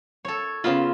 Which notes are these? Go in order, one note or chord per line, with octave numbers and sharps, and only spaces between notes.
A4 C#5
C#3 B3 F4 B5